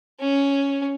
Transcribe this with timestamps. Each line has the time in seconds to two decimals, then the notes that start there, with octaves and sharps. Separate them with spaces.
0.20 C#4